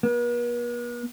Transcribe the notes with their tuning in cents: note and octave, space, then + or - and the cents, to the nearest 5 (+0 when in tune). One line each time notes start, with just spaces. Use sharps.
B3 -45